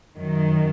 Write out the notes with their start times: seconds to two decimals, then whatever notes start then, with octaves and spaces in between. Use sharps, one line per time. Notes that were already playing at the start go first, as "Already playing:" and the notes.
0.17 F#2 D#3 F#3